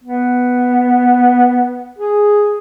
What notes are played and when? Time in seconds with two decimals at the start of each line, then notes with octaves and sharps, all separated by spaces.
0.04 B3
1.98 G#4